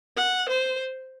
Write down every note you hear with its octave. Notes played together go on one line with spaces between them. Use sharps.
F#5
C5